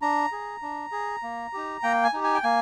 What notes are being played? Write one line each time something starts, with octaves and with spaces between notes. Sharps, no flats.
D4 A#5
G#4
D4
G#4
A#3
D#4 G4
A#3 G5
G#5
D#4 G4
G#5
G5
A#3 G#5